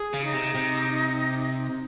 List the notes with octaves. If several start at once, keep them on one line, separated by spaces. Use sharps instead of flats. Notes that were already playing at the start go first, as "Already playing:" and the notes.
Already playing: G#4
C#3
D#4
C3
C3